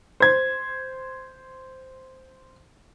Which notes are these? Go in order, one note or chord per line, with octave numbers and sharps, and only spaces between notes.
C5 G#6